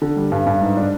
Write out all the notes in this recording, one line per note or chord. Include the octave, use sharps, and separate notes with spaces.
D3
G3
G2
G2
G#2
D4